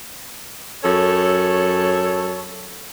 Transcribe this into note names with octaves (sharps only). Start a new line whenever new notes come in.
F#2 A4 C#5